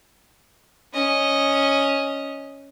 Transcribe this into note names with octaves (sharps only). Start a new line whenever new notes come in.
C#4 D#5